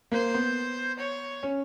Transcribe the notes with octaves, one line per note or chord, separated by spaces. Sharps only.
A#3 C5
B3
C#5
C#4